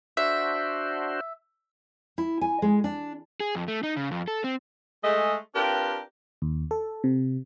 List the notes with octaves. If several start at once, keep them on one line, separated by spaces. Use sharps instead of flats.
D4 F#4 C5 E5
E4
G#5
G#3
D4
G#4
F2
A3
D#4
C#3
F2
A4
C4
G#3 A3 D#5
C4 D4 F4 G4 A#4 B4
D#2
A4
C3